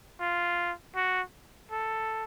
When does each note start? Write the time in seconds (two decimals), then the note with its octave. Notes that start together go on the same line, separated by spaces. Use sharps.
0.20 F4
0.95 F#4
1.71 A4